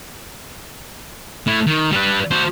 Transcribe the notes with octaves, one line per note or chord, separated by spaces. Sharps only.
A3 E4
D#3
G3 B4
F#4 C5